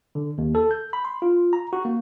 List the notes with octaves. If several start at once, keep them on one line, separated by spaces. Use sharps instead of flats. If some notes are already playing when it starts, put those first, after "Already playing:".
D3
D#2
A4
G6
B5
C6
F4
A#5
F#4
A#3